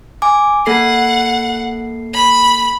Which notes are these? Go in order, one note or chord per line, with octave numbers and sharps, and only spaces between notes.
G#5 D6
A#3 A4 F#5 C7
B5